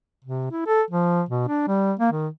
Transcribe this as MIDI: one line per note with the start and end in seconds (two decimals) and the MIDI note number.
0.24 0.49 48
0.52 0.62 64
0.67 0.82 69
0.90 1.23 53
1.29 1.45 47
1.48 1.63 62
1.67 1.94 55
2.00 2.12 58
2.12 2.28 51